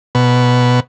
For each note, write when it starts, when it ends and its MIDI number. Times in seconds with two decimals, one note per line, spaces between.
0.15 0.80 47